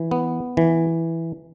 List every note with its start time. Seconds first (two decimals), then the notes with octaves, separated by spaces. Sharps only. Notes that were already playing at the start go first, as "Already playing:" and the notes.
Already playing: E3
0.11 B3
0.57 E3